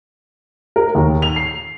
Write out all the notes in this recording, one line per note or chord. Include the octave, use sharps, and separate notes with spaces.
A#4
D#2
F7
C7